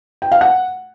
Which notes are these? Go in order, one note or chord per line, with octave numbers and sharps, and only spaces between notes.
G5
F5
F#5